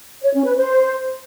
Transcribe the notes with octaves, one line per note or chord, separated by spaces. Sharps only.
C#5
C#4
B4
C5